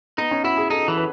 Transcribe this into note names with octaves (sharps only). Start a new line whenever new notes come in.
B3 D#4
C#4
E4 F#4
G#4
D#4 A4
E3
B4